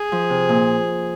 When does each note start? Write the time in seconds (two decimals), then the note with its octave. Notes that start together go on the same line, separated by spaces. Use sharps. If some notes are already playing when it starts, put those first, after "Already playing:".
Already playing: G#4
0.12 F3
0.30 C3
0.49 A#2